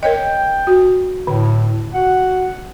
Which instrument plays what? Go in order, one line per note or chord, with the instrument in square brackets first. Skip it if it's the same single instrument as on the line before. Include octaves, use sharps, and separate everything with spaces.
[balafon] A#4 C#5 D#5 [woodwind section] G5
[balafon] F#4
[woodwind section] A2 [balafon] D3
[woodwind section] F#4 F#5